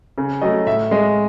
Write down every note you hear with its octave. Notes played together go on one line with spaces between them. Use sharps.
C#3
F#3 A3 D#5
A2 E5
G#3 D#5